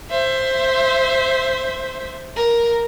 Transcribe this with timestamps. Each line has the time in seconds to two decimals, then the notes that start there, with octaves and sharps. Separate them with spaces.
0.10 C5 E5
2.36 A#4